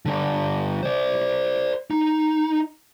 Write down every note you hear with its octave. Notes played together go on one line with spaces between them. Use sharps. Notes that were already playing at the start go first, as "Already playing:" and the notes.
D3 G3
C5 D5
D#4